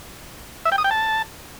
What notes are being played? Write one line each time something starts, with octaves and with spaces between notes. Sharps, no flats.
E5
G5
D#6
G5
A5